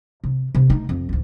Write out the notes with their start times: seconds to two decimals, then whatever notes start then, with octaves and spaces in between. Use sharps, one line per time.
0.24 C3
0.55 C3
0.70 A3 D#4
0.89 F2
1.09 A1 D2